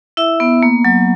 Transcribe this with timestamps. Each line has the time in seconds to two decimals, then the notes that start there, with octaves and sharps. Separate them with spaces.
0.17 E4 E5
0.40 B3
0.63 A#3
0.85 F#3